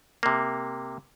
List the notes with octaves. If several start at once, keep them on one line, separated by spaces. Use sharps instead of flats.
C3 A#3